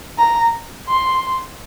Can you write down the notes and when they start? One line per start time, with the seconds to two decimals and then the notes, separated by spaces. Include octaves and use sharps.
0.18 A#5
0.88 C6